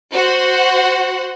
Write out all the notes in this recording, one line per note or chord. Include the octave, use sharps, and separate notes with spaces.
F#4 C5 F#5